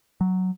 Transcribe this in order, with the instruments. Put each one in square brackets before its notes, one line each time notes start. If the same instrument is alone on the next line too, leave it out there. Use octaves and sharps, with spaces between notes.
[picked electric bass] F#3